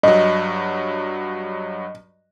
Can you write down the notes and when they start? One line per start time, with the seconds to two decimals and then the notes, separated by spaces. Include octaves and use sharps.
0.03 G2 F#3 D#5